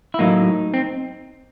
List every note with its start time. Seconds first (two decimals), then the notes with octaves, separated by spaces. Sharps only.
0.14 E4
0.19 A2 F#3 A#3 D#4
0.74 C4